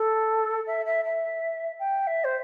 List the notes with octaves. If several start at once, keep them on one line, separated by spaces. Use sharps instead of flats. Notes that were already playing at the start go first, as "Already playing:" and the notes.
Already playing: A4
E5
E5
E5
G5
E5
C5